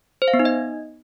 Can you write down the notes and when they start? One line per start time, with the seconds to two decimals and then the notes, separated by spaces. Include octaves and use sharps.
0.22 C5
0.28 F5
0.34 B3
0.39 D#4
0.45 D#5